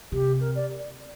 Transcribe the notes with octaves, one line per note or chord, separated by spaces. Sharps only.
C3 G4
A#4
D5